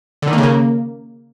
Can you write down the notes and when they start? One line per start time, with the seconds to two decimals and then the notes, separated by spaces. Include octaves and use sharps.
0.22 D3
0.28 D#3
0.33 A#3
0.38 C#3
0.43 A#3